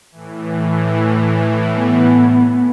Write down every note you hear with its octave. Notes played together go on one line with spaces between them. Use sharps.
A2 E3
B3